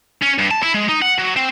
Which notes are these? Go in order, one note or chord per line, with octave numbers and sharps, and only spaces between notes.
C#4
G2
A5
E4
G#3
D#4
F#5
F#3
C4